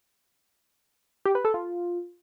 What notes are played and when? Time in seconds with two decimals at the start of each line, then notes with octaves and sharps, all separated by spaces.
1.26 G4
1.35 B4
1.45 A4
1.54 F4